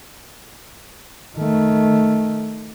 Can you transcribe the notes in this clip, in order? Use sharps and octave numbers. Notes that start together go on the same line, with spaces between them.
D#3 A3